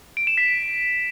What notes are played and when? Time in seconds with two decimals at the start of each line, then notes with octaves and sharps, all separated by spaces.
0.17 D7
0.27 E7
0.38 B6